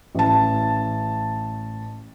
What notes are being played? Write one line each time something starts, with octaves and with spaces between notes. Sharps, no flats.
A1 A5